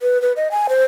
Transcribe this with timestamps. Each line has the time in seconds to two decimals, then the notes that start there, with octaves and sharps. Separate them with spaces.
0.01 B4
0.22 B4
0.36 D#5
0.52 G#5
0.69 C5